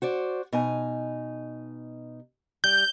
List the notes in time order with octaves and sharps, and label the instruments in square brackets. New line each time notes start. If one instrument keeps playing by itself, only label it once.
[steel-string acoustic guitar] F#4 C5 D5
B2 D#4 G#5
[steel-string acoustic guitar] G3 [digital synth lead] G6